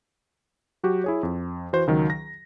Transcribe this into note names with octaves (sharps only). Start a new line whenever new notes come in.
F#3 F#4 G4
E4 G#4 C#5
F2
E3 F#4 C5
C#2 D#3 F#3
A#6